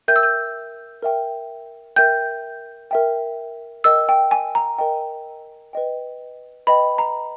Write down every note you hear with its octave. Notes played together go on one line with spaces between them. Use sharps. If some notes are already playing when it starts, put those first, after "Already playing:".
A#4 E5 G5 G6
E6
G6
A#4 E5 G5
A#4 E5 G5 G6
A#4 E5 G5
A#4 D#5 G5 E6
G5
G#5
A#5
A#4 D#5 G5
B4 D#5 G5
B4 D#5 G5 B5
A#5